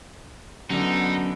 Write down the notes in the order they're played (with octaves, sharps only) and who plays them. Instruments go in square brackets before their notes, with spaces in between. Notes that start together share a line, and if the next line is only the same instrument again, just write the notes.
[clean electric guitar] F#2 [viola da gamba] D3 B3 [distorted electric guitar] D#4